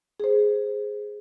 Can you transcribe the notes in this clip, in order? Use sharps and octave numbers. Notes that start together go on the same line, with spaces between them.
G#4 C5